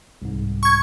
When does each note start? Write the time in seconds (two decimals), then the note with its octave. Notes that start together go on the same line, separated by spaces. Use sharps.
0.22 C2 G#2
0.63 C#6 G#6